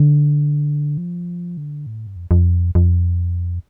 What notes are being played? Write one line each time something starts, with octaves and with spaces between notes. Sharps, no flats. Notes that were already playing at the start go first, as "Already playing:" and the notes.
Already playing: D3
F3
D3
A2
G2
F2
F2
F2